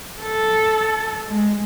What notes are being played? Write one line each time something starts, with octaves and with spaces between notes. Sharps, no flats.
A4
G#3